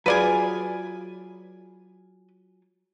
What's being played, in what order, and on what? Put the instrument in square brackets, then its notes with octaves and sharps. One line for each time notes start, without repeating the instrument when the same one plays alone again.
[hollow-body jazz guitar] F#3 F4 G#4 [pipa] B4 D5 G#5